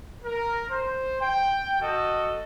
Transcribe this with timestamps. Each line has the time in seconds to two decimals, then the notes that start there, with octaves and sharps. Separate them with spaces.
0.24 A#4
0.70 C5
1.21 G5
1.81 F#4 A4 D#5